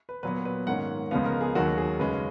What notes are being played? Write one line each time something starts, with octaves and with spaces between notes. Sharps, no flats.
B4
A#2 F#3 B3 B4
B4
G#2 D#3 A#3 C#4 F#5
C#2 C#3 F3 B3 F5
A#4
G#4
D#2 D#3 F#3 F#4
G#4
F#2 C#3 G#3 C#4 B4